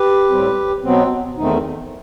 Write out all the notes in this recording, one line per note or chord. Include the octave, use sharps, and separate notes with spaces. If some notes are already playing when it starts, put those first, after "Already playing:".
Already playing: G4 B4
A2 G3 C4
B2 F#3 B3 C4
E2 D#3 A3 C4 D#4